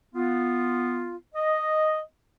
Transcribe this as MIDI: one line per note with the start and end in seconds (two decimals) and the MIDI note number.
0.14 1.15 59
0.14 1.15 65
1.35 1.99 75